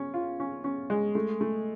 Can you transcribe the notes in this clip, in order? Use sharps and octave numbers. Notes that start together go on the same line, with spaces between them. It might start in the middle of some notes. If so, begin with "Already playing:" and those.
Already playing: C#4
F4
C#4
C#4
G#3
A3
A3